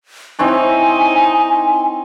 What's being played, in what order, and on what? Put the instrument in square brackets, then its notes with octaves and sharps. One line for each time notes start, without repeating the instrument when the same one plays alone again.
[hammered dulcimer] C4 E4 C#5 [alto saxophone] D#4 [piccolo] G#5